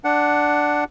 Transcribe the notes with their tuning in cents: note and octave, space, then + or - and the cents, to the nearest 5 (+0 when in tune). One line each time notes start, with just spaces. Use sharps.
D4 +0 F#5 +5